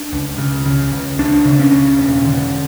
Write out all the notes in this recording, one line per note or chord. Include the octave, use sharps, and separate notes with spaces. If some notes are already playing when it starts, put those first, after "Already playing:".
Already playing: D4
C#2
C#3
C#3
C#2
C#2 D4
C#3
C#4
C#3
E1
D3